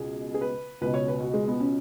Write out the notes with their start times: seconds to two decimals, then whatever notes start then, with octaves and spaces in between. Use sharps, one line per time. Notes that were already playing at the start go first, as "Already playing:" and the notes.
Already playing: C#2 B2 G#4
0.34 G#4
0.41 B4
0.81 C#2 B2 B4
0.94 C#5
1.08 B4
1.20 F#4
1.34 G#3
1.47 B3
1.60 C#4